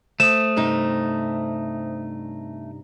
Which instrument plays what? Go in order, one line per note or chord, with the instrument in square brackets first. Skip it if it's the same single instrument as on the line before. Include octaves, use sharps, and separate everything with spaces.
[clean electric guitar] A3 [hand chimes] C5 D#6 [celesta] E7
[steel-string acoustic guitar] G2 C3 D#4